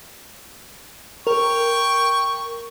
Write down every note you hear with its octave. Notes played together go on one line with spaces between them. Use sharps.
A#4 G5 C#6